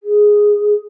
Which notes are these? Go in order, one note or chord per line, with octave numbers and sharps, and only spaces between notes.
G#4